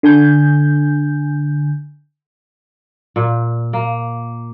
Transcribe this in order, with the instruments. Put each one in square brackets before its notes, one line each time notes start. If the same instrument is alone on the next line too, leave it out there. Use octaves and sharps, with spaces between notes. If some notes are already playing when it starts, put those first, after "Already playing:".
[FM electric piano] D3 G#5 G6
[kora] A#2
A#3